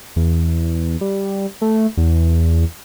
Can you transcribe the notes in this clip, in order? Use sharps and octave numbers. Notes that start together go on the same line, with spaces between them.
E2
G3
A3
E2